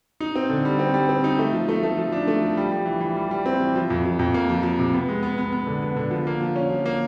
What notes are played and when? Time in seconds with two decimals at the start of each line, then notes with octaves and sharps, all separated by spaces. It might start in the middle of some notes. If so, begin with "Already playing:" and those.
0.20 D#4
0.36 C4
0.50 D3
0.65 G3
0.79 C4
0.94 G3
1.09 C4
1.24 D#4
1.39 A3
1.53 F3
1.69 A3
1.83 A3
1.97 F3
2.12 D4
2.27 A3
2.42 F3
2.57 G3
2.72 G3
2.86 E3
3.00 E3
3.16 G3
3.31 G3
3.46 C4
3.60 E3
3.75 F3
3.90 F2
4.05 F3
4.19 F2
4.34 A#3
4.49 F3
4.63 F3
4.79 C3
4.93 B3
5.09 G#3
5.23 B3
5.38 B3
5.53 B3
5.67 D3
5.82 B3
5.97 D3
6.11 F3
6.27 A#3
6.41 F3
6.56 C#4
6.70 F3
6.86 A#3